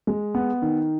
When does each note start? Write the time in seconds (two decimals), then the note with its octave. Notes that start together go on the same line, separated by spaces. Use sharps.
0.07 G#3
0.35 B3
0.62 D#3